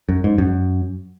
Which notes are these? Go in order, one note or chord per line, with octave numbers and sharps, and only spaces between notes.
F#2
G#2
F#2